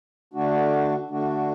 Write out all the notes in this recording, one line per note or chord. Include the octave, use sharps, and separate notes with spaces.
D3 A3 D4 F#4
D3 A3 D4 F#4